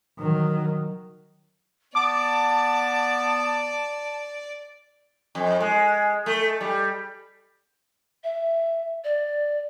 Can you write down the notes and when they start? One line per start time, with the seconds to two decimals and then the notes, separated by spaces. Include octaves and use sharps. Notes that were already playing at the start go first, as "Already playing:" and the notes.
0.19 D#3 F#3
1.95 B3 D5 A5 D6
5.35 F2
5.60 G#3
6.26 A3
6.61 G3
8.24 E5
9.04 D5